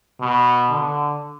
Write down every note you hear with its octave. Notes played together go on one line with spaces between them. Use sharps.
B2
D3